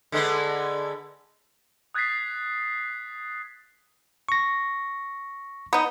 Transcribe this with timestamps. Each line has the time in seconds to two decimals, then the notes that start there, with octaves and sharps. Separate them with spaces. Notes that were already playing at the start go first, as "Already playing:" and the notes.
0.12 D3 G#3 B3
1.94 D#6 F#6 G#6 A6 B6 C7
4.29 C#6 A#6
5.73 B3 D#4